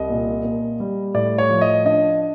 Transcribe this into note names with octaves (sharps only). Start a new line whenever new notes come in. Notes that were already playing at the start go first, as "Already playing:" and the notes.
Already playing: C2 D#5
A#2
A#3
G3
A2 D5
C#5
F3
D#5
D4 D#5